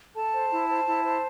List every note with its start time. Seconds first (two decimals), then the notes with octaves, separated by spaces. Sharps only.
0.15 A4 A5
0.33 C5
0.50 E4
0.69 C5
0.87 E4
1.04 C5